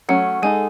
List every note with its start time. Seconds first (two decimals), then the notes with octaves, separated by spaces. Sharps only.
0.09 F#3 A3 C#4 F#5
0.42 G#3 D#4 A4 G#5